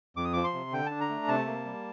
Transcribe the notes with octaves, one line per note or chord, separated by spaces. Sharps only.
F2 D6
D#6
F3 D6
C6
C3
D3 G5
D4 A5
A#5
A3
C3 A5
A#3
G3